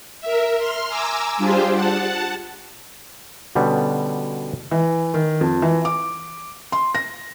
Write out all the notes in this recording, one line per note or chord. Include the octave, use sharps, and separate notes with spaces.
A#4 E5
C6 F6
G#5 A#5 D6 E6
G3 D4 F4 G4 G#4 C5
F#5 A5
B2 D3 G3 B3 C#4
E3
D#3
F2
E3
D6
C6
A#6